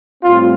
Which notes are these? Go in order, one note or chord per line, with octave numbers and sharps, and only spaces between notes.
A2 G3 C4 F4